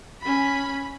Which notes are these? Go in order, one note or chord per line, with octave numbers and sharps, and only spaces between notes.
C#4 B5